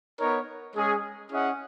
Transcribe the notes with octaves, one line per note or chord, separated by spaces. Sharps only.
B3 D#4 A#4 C#5
G#3 C#4 G#4
C#4 E4 G#4 D#5 F#5